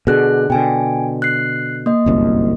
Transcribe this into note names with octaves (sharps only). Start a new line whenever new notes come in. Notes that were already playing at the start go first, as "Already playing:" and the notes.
B2 D3 G#4 F#6
B2 D3 G5 G#5
F#6 C7
A#3 D#5
G1 C2 F#2